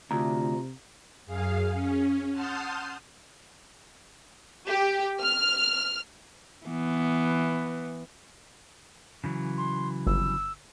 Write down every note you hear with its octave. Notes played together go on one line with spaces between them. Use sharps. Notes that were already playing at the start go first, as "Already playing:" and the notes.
D2 C3 F4 A#5
F#2 G#4 F5
C#4
F#5 A5 C6 D#6 F6 G6
G4
F6
E3 B3
C#3 E3 F#3
C6
G1 E6